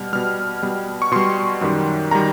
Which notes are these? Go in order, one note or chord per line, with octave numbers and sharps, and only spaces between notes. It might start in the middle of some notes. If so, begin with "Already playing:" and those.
Already playing: B2 G3 F6
B2 G3 F6
B2 G3
C#6
B2 G3 C6
F#2 D#3 G3
D#3 G3 A#5